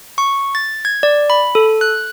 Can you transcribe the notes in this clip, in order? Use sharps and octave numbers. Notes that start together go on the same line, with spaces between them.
C#6
A6
G#6
D5
B5
A4
F#6